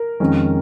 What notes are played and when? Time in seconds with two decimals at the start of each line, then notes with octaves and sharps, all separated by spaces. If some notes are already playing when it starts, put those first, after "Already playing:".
Already playing: A#4
0.20 F2 D#3 G#3 C#4